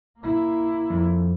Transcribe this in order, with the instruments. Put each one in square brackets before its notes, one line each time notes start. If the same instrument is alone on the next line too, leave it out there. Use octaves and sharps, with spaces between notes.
[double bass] A#3 E4
[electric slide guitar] F2